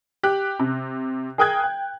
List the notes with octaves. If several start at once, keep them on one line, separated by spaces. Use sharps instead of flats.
G4 F#6
C3
G#4 A#4 G5 D#6 F#6 G#6
G5